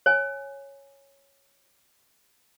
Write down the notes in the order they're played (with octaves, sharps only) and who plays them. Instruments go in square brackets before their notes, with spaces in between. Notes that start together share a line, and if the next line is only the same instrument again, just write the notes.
[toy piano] C#5 G#5